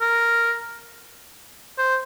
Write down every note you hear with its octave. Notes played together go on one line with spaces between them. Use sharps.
A#4
C5